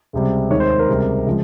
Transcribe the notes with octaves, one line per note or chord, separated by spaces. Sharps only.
C#2 C3 G3
D#2 D#3 G#3 C#5
C5
A#4
C#2 C3 G3
C#3 F3 G#3